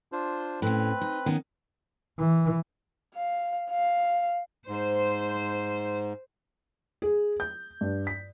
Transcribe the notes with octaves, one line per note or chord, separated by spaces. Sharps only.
D4 F4 C5
A2 C4 C#4 B4 B5
D#4
D#3 B3 C#4
E3
F5
F5
G#2 C5
G#4
G6
G2
B6